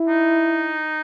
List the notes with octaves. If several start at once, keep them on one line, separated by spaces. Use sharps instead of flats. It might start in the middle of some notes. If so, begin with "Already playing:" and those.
Already playing: E4
D#4